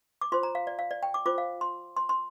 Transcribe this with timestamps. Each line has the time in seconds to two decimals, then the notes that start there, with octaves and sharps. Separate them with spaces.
0.21 D6
0.32 F4 C5 C6
0.43 A#5
0.55 F5
0.67 D5
0.79 F5
0.91 D5
1.03 G5
1.14 D6
1.26 F4 C5 D6
1.38 F5
1.61 C6
1.97 C6
2.09 C6